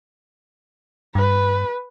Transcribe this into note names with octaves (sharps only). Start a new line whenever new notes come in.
G2 B4